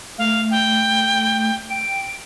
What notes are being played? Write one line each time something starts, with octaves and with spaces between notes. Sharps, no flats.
A3 F5
G5
G5 D7